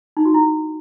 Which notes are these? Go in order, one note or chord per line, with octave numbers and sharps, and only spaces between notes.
D#4
F#4
E4